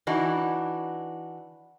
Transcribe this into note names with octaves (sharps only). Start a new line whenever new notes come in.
E3 D4 D#4 F#4